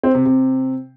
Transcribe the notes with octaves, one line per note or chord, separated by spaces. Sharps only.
C4
C3
C3